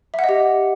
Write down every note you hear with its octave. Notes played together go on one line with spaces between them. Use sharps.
E5
F#5
D#5
G4